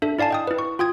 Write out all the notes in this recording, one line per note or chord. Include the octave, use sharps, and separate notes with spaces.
D4 A4 E5
E4 D5 F5 G#5 A5
D#5 G5 D#6
E4 B4
C#6
F4 G5 D#6 G#6